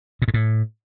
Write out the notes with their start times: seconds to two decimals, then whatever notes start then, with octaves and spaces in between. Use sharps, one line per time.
0.22 A#2
0.28 G#2
0.34 A2